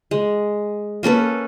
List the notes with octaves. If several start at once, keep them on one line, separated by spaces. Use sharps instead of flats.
G#3
A#3 C#4 A4 B4